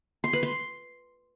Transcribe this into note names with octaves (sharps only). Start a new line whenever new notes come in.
C6
B4
C6